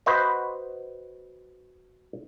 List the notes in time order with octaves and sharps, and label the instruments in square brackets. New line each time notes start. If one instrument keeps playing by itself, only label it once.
[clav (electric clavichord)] F#4 B4 C5 D#5